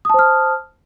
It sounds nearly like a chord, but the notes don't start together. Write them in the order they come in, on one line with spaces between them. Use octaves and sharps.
D#6 A5 C5 F6